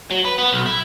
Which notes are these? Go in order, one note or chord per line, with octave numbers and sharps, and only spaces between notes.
F#3
B4
B3
B1
E4